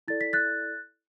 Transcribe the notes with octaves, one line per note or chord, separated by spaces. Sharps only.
E4 A4 D5 A6
B6
F#6 A6